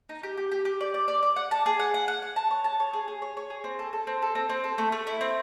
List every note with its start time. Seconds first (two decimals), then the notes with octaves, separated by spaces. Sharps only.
0.09 D#4
0.23 G4
0.37 G4
0.52 G4
0.65 G4
0.81 D5
0.94 D5
1.08 D5
1.23 D5
1.36 F#5
1.51 A5
1.66 G#4
1.79 F#5
1.94 F#5
2.08 F#5
2.22 F#5
2.36 A5
2.51 C#5
2.64 A5
2.80 C#5
2.93 G#4
3.08 G#4
3.22 C#5
3.37 C#5
3.50 G#4
3.64 C4
3.79 A4
3.93 A4
4.07 C4
4.22 A4
4.35 C4
4.49 C4
4.64 A4
4.78 A3
4.92 A3
5.07 E4
5.21 C4